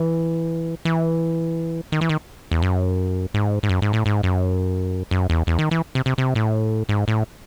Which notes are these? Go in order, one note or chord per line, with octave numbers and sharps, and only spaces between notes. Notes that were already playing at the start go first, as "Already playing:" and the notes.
Already playing: E3
E3
D#3
E3
D#3
E2
F#2
G#2
G#2
F#2
G#2
A2
G#2
F#2
F#2
E2
E2
D#3
E3
C3
C3
C3
A2
G#2
A2